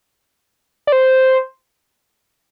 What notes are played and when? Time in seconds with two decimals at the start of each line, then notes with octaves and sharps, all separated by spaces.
0.87 D5
0.92 C5